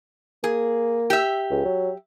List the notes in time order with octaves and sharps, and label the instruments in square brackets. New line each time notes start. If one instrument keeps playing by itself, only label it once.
[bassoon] A#3 [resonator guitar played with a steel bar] G#4
[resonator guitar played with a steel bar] G4 E5
[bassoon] C#2
F#3